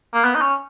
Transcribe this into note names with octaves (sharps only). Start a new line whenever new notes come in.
A#3
B3
D#4
C#4